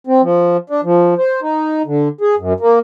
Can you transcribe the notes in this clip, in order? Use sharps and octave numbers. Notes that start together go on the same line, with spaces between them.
C4
F3
D4
F3
C5
D#4
D3
G#4
F#2
A#3